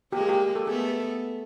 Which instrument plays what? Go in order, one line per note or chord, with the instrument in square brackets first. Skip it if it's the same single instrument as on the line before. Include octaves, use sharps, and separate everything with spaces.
[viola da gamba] G#3 A#3 [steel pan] G4
[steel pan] G#4
G4
A4
[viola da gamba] A3 B3 [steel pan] G#4